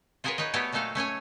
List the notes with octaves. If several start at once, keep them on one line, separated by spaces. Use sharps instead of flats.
F4 F#4 G#4 A#4 B4 C#5
D#4 B4 C#5 D#5
A3 B3 F#4 G4 C#5 D5
A#2 F#3 A3 D#4 A4 F5
A3 C#4 C#5 G#5